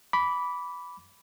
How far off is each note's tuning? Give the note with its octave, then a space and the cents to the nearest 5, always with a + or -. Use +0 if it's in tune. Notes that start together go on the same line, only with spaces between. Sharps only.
B5 +0 D6 -20